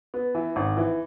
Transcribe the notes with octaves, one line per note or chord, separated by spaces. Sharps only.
B3
E3
G#1
E3